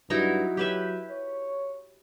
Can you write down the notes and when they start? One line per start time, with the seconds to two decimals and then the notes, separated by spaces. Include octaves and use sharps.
0.10 G2 F#3 D#4 E4
0.57 F#3 G4 B4 E5
1.10 C#5